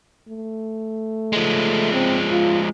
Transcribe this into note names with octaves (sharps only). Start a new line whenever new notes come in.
A3
F3 G#3
C4
F4